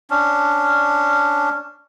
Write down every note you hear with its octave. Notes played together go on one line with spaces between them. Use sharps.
C#4 D4